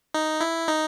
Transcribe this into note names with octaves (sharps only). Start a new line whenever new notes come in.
D#4
E4
D#4